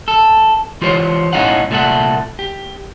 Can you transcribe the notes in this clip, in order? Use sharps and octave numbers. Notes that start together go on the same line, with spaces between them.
A4
E3 F4 G4 C5 C#5
B1 A2 C#4 D#4 F5 F#5
C2 A#2 A3 G4 A4 F#5
G4